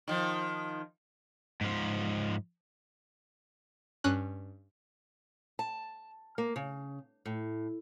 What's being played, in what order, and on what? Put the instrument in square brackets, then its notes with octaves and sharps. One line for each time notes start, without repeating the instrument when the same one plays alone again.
[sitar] D#3 F3
[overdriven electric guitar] G#2 F3
[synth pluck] G2 C#4 F#6
[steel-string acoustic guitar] A5
A#3
C#3
A2